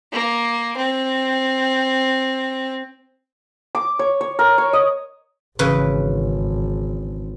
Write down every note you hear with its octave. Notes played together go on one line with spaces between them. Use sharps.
A#3
C4
D6
C#5
C#5
A#4
C#5
D#5
G#1 C#3 E3 B4